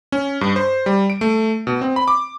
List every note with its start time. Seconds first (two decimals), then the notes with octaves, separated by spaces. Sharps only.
0.12 C#4
0.41 G2
0.56 C5
0.86 G3
1.10 D7
1.21 A3
1.67 B2
1.81 C4
1.96 B5
2.08 D6